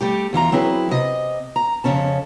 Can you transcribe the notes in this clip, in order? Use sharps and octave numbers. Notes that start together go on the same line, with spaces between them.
G3 A3 G4
E2 E3 F4 A#5
F#3 C4 E4 G#4 B4
C3 D#5
A#5
F2 A#2 C#3 C#4 A5